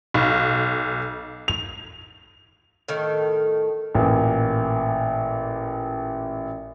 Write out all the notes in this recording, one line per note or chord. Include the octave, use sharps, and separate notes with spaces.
B1
F7
A2 D#3
A1 A#2